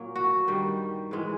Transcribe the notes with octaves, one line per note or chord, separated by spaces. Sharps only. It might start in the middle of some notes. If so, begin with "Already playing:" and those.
Already playing: A#2 F#3 A#3
F#4
G2 D#3 G3
G#2 E3 G#3